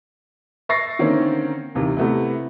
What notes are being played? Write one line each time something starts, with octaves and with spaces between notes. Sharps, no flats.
E5 C#6 A6 A#6 C7
D3 D#3 A#3 C4 C#4
D#2 C3 E3
C3 A3 B3 E4